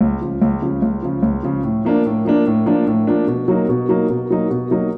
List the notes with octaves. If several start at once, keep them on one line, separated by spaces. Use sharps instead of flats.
C#2
C#3 F3
C#2
C#3 F3
C#2
C#3 F3
C#2
C#3 F3
A2
F3 A#3 D4
A2
F3 A#3 D4
A2
F3 A#3 D4
A2
F3 A#3 D4
B2
F#3 A#3 D#4
B2
F#3 A#3 D#4
B2
F#3 A#3 D#4
B2
F#3 A#3 D#4